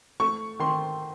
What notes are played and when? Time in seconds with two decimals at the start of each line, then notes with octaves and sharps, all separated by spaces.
0.20 A3 C#6
0.60 D#3 C6